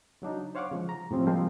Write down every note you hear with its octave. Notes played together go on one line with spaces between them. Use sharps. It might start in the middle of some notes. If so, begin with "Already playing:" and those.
C#3 F#3 D4 D#4
C5 C#5 F5 F#5 C#6 D6
C#3 F3 G#3
A#5
A2 C3 F3 C4 C#4
F3 G3 G#3 A#3 C4